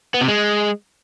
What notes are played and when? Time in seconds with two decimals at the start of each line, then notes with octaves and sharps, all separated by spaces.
0.14 B3
0.21 C3
0.28 G#3